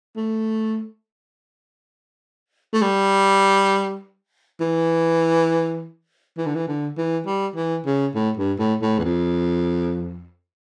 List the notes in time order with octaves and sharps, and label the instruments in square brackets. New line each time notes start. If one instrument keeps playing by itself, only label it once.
[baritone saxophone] A3
A3
G3
E3
E3
D3
E3
D3
E3
G3
E3
C#3
A2
G2
A2
A2
E2
F2